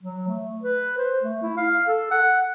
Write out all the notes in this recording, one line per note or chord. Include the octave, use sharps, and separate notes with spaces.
F#3
A3
B4
C5
A3
E4
F5
A4
F#5